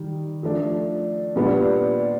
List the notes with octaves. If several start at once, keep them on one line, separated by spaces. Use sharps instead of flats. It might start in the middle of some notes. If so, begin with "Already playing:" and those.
Already playing: D#3 G3
F3 A3 D4
A#2 G3 B3 D4